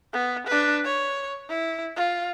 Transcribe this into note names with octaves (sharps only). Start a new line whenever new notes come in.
B3
D4 B4
C#5
E4
F4